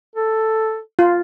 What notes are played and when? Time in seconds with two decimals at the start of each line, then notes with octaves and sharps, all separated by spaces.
0.16 A4
0.99 F4